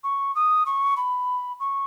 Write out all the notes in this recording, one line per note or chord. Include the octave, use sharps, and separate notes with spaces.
C#6
D#6
C#6
B5
C#6